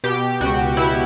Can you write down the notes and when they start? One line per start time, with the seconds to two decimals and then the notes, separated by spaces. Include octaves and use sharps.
0.04 B2 G4
0.40 C#2 F#4
0.77 B2 E4